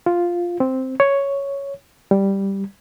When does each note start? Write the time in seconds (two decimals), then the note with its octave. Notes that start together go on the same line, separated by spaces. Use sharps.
0.06 F4
0.60 C4
1.00 C#5
2.11 G3